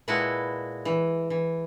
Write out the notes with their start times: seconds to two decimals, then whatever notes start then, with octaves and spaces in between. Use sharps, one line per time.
0.08 A#2 G#3 E4 F#4 B4 A5
0.85 E3
1.30 E3